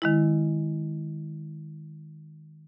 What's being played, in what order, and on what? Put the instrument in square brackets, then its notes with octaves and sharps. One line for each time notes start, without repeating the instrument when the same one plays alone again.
[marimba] D#3 G#3 E4